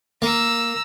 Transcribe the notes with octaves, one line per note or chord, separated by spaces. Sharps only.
A#3 A#5 E6